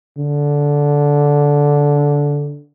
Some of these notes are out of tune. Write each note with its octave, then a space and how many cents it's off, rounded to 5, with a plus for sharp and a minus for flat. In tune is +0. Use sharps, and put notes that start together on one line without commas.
D3 -15